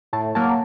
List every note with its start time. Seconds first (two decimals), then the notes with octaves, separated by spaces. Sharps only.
0.13 A2 A5
0.35 F#3 A#3 A5